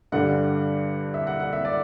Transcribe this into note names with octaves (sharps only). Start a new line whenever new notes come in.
G2 D3 G3 D4 F#5
E5
F#5
F#5
E5
D5